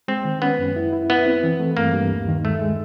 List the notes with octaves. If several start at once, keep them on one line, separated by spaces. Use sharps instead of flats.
G#3 C4
D#3
B3 C#4
F#2
E4
E4
B3 E4
C4
E3
A3
G2 A#3
G2
D#2
D#3
G#3 A3
G#3